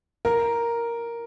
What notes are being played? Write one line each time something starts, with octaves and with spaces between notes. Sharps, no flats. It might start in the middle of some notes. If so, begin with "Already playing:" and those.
A#4